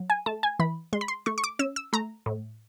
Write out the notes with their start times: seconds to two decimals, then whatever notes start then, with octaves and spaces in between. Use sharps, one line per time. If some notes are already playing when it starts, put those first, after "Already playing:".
Already playing: F#3
0.10 G#5
0.26 A3 A5
0.43 G#5
0.59 E3 B5
0.93 G#3 C6
1.01 B5
1.08 C6
1.26 A3 C#6
1.38 C#6
1.44 D6
1.59 C#4 E6
1.76 E6
1.93 A3 A#5
2.26 A2